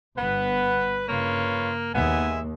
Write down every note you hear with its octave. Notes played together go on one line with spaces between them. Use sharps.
G1 G2 B3 B4
G2 C#3 A#3 F4 B4 C#5
D#2 G#3 B3 E5 G#5